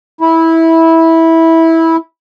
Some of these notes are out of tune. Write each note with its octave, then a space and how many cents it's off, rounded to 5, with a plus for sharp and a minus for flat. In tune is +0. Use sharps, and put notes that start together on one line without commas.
E4 -15